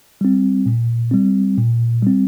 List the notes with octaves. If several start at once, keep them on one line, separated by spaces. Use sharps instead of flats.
G3 C4
A#2
G3 C4
A#2
G3 C4